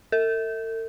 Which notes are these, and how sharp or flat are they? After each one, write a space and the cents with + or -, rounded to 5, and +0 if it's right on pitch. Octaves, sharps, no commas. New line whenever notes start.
A4 +45